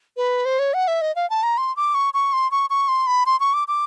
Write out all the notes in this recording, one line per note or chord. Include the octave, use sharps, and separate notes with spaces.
B4
C5
C#5
F#5
E5
D#5
F5
A5
A#5
C6
D6
C#6
C#6
C6
C#6
C#6
C6
B5
C6
C#6
D6
D6